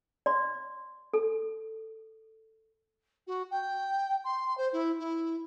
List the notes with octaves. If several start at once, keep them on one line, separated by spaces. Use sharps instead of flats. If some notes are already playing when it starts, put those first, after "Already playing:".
D5 C6
A4
F#4
G5
C6
C5
E4
E4